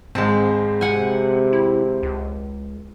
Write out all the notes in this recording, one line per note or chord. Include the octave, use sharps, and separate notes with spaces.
G#1 G#2 G#3 C4 A5
C3 F#5 G#5
E4
C#2